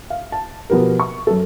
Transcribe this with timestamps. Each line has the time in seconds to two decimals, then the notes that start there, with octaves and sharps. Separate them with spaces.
0.10 F5
0.32 A5
0.70 B2 F3 B3 G4 A#4
1.00 C#6
1.27 F#2 A4